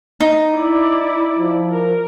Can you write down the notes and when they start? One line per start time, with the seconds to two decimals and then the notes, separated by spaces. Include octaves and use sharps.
0.20 D#4
0.55 E4 D5
1.39 F3
1.71 A#4